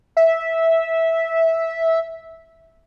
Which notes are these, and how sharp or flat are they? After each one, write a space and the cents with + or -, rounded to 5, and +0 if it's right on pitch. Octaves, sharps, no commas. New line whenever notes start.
E5 -10